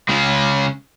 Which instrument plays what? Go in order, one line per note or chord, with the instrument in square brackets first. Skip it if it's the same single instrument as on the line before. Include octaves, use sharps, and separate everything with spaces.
[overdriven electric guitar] C#3 G#3